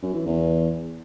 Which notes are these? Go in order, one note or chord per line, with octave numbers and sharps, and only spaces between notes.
F#2
E3
E2